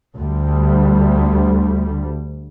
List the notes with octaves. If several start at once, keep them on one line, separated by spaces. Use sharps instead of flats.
D2 G3